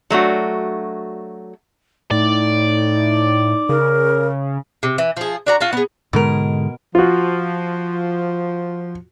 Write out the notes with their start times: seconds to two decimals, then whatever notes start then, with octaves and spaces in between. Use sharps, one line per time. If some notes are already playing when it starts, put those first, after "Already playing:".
0.10 F#3 A3 D4 F#4
2.11 A2 D#4 D5
3.69 C#3 A#4
4.83 C3
4.98 E3
5.17 F3 G#4
5.46 D4 F#4 A#5
5.61 F4 F#4 A5
5.73 B3 G#4
6.13 G#2 B2 D3 G#3 A#4
6.95 F3 F4 F#4